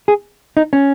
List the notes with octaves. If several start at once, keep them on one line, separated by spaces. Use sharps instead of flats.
G#4
D#4
C#4